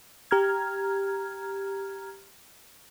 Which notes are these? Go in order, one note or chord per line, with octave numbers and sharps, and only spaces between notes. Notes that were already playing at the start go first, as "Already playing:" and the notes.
G4 A#5 F6 G#6